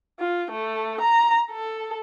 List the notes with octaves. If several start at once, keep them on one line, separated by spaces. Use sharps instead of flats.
F4
A3
A#5
A4